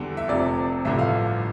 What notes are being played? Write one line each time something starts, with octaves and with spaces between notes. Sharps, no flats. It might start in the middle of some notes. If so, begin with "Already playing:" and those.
Already playing: E2 D3 G3
E5
F1 F2 C3 D5
A1 G2 D3 F3 E5
F5